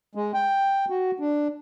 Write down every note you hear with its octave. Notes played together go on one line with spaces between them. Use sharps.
G#3
G5
F#4
D4